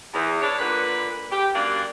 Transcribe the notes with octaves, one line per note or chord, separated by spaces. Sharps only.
E2
D4 C#5
A#2 D3 B4
G4
F#2 A#3 D4 D5